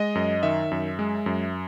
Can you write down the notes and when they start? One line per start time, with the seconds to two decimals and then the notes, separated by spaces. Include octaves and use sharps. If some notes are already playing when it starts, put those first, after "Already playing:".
Already playing: G#3 D#5
0.15 F#2
0.43 D#3 E5
0.71 F#2
0.99 G#3
1.26 F#2